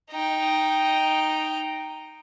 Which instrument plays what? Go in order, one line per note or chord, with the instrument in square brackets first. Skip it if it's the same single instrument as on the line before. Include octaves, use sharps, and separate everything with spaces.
[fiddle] D#4 G5